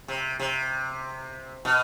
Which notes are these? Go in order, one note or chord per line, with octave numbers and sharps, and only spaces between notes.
C3
C3
B2